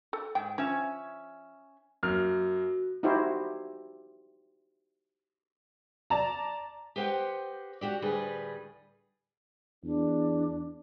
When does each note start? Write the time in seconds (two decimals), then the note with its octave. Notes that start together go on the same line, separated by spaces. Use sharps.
0.13 A4
0.35 G#2 G5
0.58 F3 C#4 E5
2.03 F#2 A#3 F#4 F6
3.03 D#4 E4 F#4 G4 C5
6.10 D5 A5 A#5
6.96 G4 B4 C5 D#5 F#5 G5
7.81 F#4 G4 D5
8.02 D2 A2 G3 G#4 B4
9.84 E2 D4